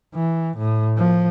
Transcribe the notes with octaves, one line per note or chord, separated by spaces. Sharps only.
E3
A2
F3